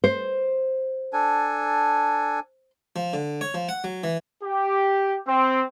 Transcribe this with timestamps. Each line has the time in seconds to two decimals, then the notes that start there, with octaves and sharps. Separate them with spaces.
0.04 C5
1.13 D4 A4 G#5
2.96 F3
3.13 D3
3.41 C#5
3.54 F3
3.69 F#5
3.84 F#3
4.04 E3
4.44 G4
5.28 C4